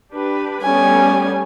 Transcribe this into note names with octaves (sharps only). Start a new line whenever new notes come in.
D4 G4 B4
G3 A3 B3 C#4 G#5